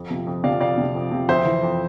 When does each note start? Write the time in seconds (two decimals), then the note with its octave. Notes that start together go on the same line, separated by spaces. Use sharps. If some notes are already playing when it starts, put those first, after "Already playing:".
Already playing: F2
0.10 C3 F3
0.27 F2
0.44 C3 F3 D5 F5
0.61 F2 D5 F5
0.78 C3 F3
0.95 F2
1.12 C3 F3
1.28 F2 C5 E5
1.45 E3
1.63 F2